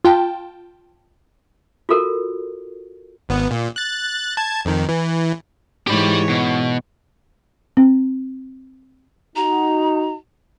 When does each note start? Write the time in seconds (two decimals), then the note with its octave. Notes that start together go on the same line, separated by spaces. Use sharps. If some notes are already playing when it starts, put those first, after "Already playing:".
0.05 F4 G5 A5
1.89 F4 F#4 A4 A#4
3.29 G#1 B3
3.51 A#2
3.76 F#6 A6
4.37 A5 G#6
4.65 F2 D#3
4.89 E3
5.88 G#2 E3 G4 C#5 B5
6.29 B2
7.77 C4
9.36 D#4 F#4 A#5